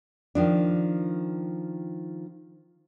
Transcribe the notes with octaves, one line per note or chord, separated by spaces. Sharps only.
D#3 F3 D4